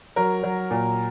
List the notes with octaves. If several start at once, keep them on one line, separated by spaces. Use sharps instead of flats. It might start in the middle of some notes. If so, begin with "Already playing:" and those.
F#3 A#4
F#3
A#2